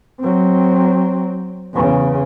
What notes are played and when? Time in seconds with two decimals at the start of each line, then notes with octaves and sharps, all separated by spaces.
0.20 F#3 C4
1.74 E2 C#3